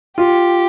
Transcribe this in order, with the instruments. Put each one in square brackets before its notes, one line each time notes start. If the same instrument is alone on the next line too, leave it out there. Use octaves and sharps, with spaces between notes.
[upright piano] F4 [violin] G4